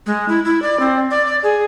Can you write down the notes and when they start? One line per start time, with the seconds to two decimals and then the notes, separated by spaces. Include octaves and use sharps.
0.06 G#3
0.29 E4
0.45 E4
0.62 D5
0.80 C4
1.11 D5
1.26 D5
1.43 G#4